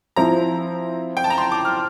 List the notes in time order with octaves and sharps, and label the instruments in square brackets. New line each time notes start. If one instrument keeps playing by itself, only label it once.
[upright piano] F3 C4 E4 [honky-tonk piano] A#5
[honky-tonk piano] G5
A5
A#5
C6
D6
F6